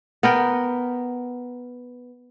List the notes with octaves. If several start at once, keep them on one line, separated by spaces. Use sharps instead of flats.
B3 A#4 G5